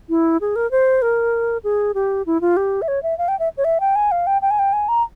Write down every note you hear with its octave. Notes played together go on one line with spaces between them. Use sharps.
E4
G#4
A#4
C5
A#4
G#4
G4
E4
F4
G4
E5
C#5
E5
F5
G5
E5
C#5
E5
G5
G#5
F5
G5
G5
G#5
G5
G#5
A#5